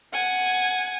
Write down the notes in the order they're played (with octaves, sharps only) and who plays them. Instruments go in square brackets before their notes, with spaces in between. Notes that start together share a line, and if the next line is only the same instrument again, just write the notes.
[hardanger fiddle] F#5 [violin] G#5